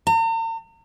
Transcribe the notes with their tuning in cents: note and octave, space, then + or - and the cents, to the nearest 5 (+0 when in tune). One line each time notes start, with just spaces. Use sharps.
A#5 -45